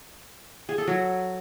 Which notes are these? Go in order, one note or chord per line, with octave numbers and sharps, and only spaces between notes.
G#4
A4
F#3